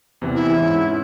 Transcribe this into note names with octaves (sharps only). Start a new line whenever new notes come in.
E2 C3 E3
E4
G#2 C#4